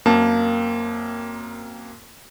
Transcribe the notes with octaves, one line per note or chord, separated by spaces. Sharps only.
F#2 A#3 C4 A5